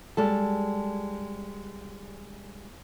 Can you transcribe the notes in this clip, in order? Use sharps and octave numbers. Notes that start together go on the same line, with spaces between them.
G3 G#3 A4